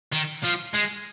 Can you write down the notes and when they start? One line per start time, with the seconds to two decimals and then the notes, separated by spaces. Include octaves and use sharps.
0.12 D#3
0.43 F3
0.74 G#3